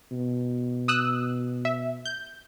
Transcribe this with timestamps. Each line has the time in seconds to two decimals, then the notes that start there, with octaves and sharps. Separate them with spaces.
0.12 B2
0.88 D#6 E6 F#6
1.65 E5
2.05 G6